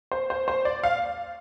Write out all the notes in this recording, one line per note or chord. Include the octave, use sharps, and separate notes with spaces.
C5
C5
C5
D5
F5